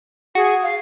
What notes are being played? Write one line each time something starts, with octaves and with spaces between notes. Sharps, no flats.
F#4 G#4
F5